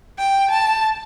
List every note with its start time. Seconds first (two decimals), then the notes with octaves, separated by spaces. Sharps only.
0.18 G5
0.50 A5